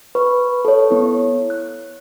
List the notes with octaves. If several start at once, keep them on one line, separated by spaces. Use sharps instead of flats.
B4 C#6
A4 C#5
B3 E4
F#6